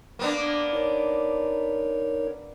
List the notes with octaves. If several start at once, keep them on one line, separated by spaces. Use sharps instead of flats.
A#3 B3 D4
D#4 A#4 C#5